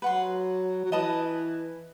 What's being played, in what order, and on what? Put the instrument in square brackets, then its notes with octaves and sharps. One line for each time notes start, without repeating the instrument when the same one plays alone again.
[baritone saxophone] F#3 [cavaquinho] B4 F#5 C6
[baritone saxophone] F#3
[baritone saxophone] E3 [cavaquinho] B4 D#5 A5 D#6